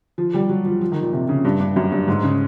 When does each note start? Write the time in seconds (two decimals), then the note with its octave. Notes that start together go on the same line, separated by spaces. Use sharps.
0.18 F3
0.34 G3
0.49 F#3
0.65 F3
0.81 F3
0.92 D#3
1.02 A#2
1.13 C3
1.29 C#3
1.45 G2
1.60 G2
1.76 F#2
1.92 G2
2.08 G#2
2.23 C#3